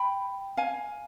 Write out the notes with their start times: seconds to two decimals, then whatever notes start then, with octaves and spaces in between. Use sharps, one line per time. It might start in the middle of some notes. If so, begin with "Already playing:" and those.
Already playing: G5 B5
0.57 F5 G#5